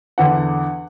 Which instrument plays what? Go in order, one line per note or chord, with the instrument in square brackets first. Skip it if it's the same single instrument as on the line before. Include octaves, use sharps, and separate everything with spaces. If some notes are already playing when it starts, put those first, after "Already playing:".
[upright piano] E2 D3 F#5